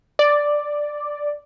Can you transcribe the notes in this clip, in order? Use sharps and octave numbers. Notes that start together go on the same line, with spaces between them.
D5